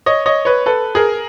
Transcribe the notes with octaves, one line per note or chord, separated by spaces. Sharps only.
C#5 D#5
C#5 D#5
B4 C#5
A4 B4
G#4 A#4